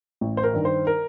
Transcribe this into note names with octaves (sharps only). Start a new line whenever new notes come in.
A1
C5
A#4
G2 D#3
C5
A#4